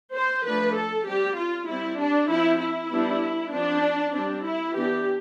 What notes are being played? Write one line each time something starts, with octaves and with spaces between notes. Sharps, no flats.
C5
F3 A3 D4 B4
A4
G3 C4 G4
F4
G3 C4 E4
D4
F3 C4 E4
E4
G3 B3 D4
F3 C4 D4
G3 C4 D4
E4
E3 B3 D4 G4